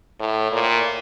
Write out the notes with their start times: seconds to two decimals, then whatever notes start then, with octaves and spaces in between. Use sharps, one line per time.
0.20 A2
0.52 A#2